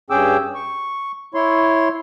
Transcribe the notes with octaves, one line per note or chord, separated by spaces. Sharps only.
G2 C#4 G#4 G5 D6 E6
C#6
E4 C#5 C6